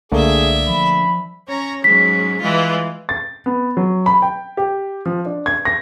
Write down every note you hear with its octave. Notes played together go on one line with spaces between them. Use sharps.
C2 D3 A3 A#3 G#4 D5 E5
F3 B5
C#4 C#5 A#5
G#2 F#3 C#4 B6
E3 G#3 F4
A6
B3
F#3
B5
G5
G4
F3
D4
G#6
A#6